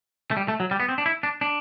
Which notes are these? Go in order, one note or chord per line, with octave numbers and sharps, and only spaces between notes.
A3
G3
A3
F#3
G3
B3
C4
D4
E4
D4
D4